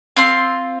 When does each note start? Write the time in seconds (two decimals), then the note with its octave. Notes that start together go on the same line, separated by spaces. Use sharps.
0.17 C4 F4 C6